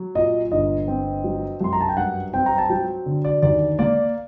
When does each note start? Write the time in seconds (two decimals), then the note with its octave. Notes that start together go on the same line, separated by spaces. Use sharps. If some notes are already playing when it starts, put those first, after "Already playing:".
Already playing: F#3
0.15 A#2 D#5
0.52 G1 D#5
0.88 C4
1.24 F#3
1.61 F#2 C6
1.73 A#5
1.81 A5
1.89 G5
1.97 G2 F#5
2.33 C4 G5
2.46 A#5
2.58 A5
2.70 F#3 G5
3.06 D3
3.25 D5
3.42 D#2 D5
3.79 A#3 D5